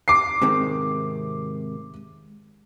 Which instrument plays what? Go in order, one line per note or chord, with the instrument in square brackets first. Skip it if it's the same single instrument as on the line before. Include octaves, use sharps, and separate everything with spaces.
[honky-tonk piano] D6 C7
[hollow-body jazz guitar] G#2 C3 D#3